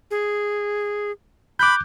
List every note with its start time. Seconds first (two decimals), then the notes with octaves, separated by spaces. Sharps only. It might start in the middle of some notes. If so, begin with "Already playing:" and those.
0.11 G#4
1.59 B5 D6 F#6 G6